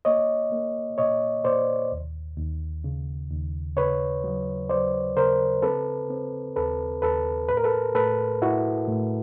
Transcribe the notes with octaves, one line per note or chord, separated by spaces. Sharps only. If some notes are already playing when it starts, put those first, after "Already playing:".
A#3 C#5 D#5
A#3
A#2 C#5 D#5
A#2 C5 D5
D#2
D#2
C#3
D#2
C#3 B4 C#5
F#3
F#3 C5 D5
C#3 A#4 C5
C4 A4 B4
C4
D#2 A4 B4
D#2 A4 B4
A2 B4
A#4
A4 B4
A2 A4 B4
A2 E4 F#4
A2